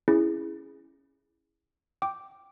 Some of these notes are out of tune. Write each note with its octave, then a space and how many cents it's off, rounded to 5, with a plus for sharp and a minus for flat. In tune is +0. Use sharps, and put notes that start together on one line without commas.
C#4 -5 E4 +0 G#4 +0
G5 +0 D6 +0